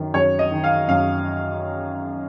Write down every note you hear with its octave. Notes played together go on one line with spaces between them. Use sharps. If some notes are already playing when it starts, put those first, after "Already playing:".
Already playing: F#2 D#3
F#2 C#5
D#5
D#3
F5
F#2 F5